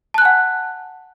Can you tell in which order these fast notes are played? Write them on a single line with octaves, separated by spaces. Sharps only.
A5 F#6 G#5 F#5